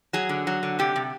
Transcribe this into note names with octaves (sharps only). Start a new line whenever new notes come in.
F#3 G#4
D3
F#3
D3
C3 G4
C3